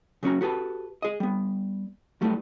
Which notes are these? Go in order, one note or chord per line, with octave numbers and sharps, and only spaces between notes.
C#3 F#3 C#4 F#4 A#5
F#4 G4 A4 B4 A5
G#4 D#5
G3 B3
F#3 G3 A3 B3 E4